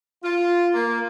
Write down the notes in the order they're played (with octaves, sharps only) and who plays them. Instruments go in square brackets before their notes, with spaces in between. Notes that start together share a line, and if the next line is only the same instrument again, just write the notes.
[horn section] F4
A#3